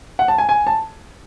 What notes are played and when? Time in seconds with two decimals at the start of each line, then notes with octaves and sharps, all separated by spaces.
0.19 F#5
0.28 A5
0.38 G#5
0.49 G#5
0.67 A5